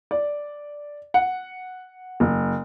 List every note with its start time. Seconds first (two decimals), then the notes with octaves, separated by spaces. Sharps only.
0.11 D5
1.14 F#5
2.20 F#1